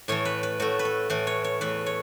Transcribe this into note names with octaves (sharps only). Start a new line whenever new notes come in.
A2 E3 A3 C#5
B4
B4
A2 A3 F#4
B4
A4
A2 E3 A3 B4
C#5
C#5
E2 E3 A3 B4
C#5